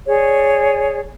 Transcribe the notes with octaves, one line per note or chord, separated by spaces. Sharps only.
G#4 C#5 D5